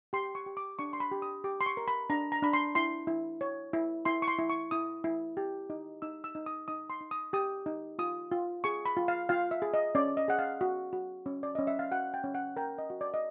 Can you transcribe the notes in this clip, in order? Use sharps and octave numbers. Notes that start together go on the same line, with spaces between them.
G4 C6
C#6
G4
D6
D4 C#6
C6
B5
G4
D#6
G4 D6
C6
C#6
A#4
B5
D4 A#5
A#5
D4 B5
C6
E4 C6
E4
C#5
E4
E4 C6
C#6
C6
E4
C#6
E4 D#6
E4
G4
D#4
D#4 E6
E6
D#4
D#6
D#4 D#6
C6
D#4
D#6
G4 D#6
D#4
F4 D#6
F4
G#4 C#6
B5
F4
F5
F4 F5
E5
G#4
D#5
C#4 D5
D#5
G#4 F#5
F5
F#4
F#4
C#4
D5
C#4 D#5
E5
F5
F#4 F#5
G5
C#4
F#5
A#4 G5
D#5
F#4
D5
D#5